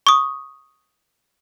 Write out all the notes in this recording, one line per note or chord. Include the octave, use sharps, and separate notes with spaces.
C#6 D#6